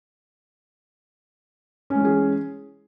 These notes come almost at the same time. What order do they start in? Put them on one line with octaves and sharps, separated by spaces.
C#4 G#3 E3 G#4